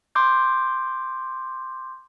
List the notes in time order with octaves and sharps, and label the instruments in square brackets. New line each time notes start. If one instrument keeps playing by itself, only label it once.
[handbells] C6 D6 G6